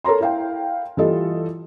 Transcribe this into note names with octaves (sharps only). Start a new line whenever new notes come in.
A4 A#4 C#5 A#5 C6
E4 F5 G5
E3 G3 F4 A4 D#5